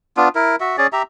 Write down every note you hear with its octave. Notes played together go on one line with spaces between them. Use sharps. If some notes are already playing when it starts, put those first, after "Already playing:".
B3 D4 F4
E4 A#4
F#4 E5
C#4 G#4 D5
G4 E5 A#5